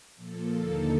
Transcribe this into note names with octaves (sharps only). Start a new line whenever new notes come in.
A#2 F3 A#3 A4
D#2 D3 F3 A#3 D#4